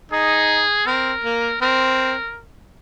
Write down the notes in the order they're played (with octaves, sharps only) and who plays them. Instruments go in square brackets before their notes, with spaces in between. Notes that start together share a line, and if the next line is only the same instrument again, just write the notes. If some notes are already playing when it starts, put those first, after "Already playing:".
[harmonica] D#4 [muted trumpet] G#4
[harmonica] C4 [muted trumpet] A#4
[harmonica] A#3
[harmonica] C4 [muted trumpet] A#4